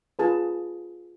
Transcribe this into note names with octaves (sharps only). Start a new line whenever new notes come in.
F4 G#4 B4 A5